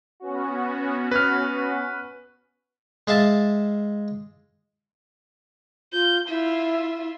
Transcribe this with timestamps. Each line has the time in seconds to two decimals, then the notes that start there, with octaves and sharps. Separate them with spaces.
0.20 B3 C#4 F#4
1.11 B4 F6
3.07 G#3 E5 F5 A5
5.93 F4 G6
6.29 E4 F4 E5